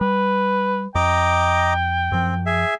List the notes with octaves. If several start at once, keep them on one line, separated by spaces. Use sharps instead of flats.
G3 B4
F2 D#5 G5 A#5 D6
F#2 F3 C4
G#4 E5